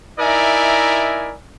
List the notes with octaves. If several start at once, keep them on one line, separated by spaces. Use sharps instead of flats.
D#4 E4 A#4 D5 E5 G#5